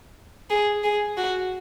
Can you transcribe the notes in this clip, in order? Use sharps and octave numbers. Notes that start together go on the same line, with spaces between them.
G#4
G#4
F#4